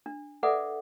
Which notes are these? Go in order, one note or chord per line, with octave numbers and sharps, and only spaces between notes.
D4
A4 B4 D5 E5 F#5 D6